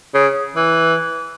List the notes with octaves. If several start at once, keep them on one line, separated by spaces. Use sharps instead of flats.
C#3
E3